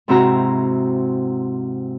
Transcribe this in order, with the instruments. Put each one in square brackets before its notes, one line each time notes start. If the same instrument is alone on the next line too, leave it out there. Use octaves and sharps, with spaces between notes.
[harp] G#2 C3 C4 E4 F#4 A#5